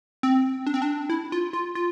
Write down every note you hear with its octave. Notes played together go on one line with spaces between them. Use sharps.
C4
D4
C4
D4
E4
F4
F4
F4